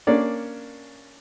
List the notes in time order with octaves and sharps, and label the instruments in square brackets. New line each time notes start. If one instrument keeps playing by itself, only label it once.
[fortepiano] A#3 C#4 D4 D5